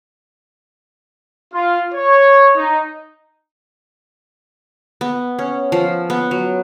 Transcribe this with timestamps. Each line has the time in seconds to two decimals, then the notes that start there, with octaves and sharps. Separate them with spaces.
1.54 F4
1.95 C#5
2.57 D#4
5.01 B3
5.39 C#4
5.72 F3
6.10 B3
6.31 F#3